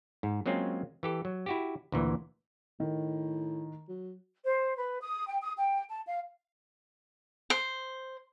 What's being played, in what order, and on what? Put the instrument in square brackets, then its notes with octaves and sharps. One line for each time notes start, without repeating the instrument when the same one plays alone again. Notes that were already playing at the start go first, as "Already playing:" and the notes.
[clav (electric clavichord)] G#2
F#3 G#3 A#3 C4 C#4 F4
E3 G4 A4
F#3
E4 F#4 G4
D2 A#2 E3
[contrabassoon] A2 [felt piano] D#3
[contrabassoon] F#3
[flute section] C5
B4
D#6
G5
D#6
G5
A5
F5
[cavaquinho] C5